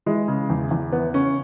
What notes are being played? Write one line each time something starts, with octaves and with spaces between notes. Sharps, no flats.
E3 G#3
C#3
E2
E2
E3 B3
C#3 C#4